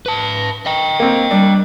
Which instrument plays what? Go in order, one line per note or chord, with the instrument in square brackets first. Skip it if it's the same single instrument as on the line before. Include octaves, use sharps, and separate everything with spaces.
[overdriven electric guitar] B4 A5
D#5 G5
[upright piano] A#3 C4
[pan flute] G3 [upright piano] D4